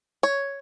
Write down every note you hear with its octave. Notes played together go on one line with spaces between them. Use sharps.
C#5